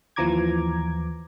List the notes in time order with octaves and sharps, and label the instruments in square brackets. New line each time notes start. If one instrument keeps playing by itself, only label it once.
[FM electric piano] D#2 E3 F3 A#5 D6 G#6